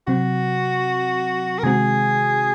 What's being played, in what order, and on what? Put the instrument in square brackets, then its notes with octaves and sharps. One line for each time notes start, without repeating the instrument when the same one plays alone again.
[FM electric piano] C3 F#3 C4 [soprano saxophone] F#4
[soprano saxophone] A#4
[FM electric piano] C3 D#3 G#3 C4 F#4 [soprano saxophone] G#4